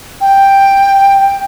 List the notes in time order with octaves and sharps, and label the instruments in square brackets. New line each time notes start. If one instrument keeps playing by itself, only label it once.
[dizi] G5